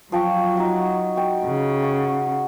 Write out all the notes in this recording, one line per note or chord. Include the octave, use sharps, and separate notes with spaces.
F3 F#3 G5 C#6
D#4 F#4
F#4 G5
C#3
F#5 C#6